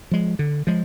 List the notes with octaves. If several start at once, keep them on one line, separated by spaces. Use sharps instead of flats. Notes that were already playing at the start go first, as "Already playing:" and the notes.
F3 G#3
D3
F3 G#3